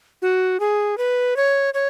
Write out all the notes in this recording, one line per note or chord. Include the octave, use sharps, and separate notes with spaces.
F#4
G#4
B4
C#5
C#5